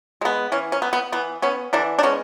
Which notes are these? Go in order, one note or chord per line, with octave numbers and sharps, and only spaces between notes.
G#3 B3
E3 C#4
C#4
B3
B3
E3 B3
B3 C#4
D3 E3 D4
D4
G#3 B3 C#4